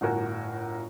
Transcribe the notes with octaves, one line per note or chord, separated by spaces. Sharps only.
G1 A2 F#4 A#4 G#5